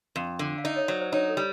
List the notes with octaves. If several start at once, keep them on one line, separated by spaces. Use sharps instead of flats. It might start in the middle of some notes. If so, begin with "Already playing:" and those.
F2
D3
F5
D#4 D5 E5
C#5 D#5
F#3 C5 D5
C5 D5
D#4 B4 C#5
A4
G3